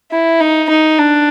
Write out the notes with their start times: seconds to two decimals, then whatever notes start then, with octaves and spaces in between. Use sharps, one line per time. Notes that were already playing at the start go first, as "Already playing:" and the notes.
0.12 E4
0.40 D#4
0.69 D#4
0.98 D4